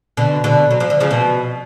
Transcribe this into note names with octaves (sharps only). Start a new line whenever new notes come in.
B2 D3
B2 D3
F#3
F3
D3
C#3 F3
B2